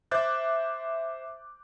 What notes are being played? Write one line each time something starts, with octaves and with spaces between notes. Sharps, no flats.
C5 E5 D6 F#6 G6 A6